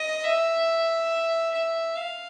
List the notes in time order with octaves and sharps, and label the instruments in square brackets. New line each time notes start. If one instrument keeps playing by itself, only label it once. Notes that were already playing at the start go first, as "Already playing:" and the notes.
Already playing: [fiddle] D#5
E5
E5
F5